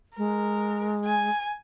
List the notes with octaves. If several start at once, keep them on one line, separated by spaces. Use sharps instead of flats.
G#3 A#4
G#5